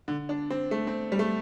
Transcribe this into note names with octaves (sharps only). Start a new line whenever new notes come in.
D3
D4
C4
A3
C4
G3
A3